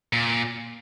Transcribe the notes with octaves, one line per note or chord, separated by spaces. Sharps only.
A#2